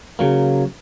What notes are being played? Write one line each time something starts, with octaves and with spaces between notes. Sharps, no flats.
C#3 F#3 A#3